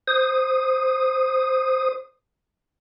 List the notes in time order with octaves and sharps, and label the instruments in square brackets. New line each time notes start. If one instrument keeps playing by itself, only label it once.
[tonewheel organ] C5 D#6